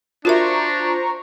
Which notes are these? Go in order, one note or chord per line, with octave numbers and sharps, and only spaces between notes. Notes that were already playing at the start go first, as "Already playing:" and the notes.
D4 F4 F#4 A#4 C5 E5 A#5 C#6